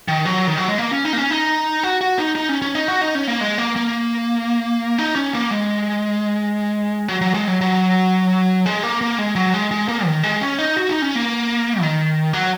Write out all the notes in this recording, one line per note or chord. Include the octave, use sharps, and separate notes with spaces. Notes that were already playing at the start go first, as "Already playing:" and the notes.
D#3
F#3
D#3
F#3
G#3
A#3
C#4
D#4
A#3
C#4
D#4
F#4
F#4
D#4
D#4
C#4
C#4
D#4
F#4
D#4
C#4
A#3
G#3
A#3
A#3
D#4
C#4
A#3
G#3
F#3
F#3
G#3
F#3
F#3
G#3
A#3
A#3
G#3
F#3
G#3
G#3
A#3
D#3
G#3
C#4
D#4
F#4
D#4
C#4
A#3
D#3
F#3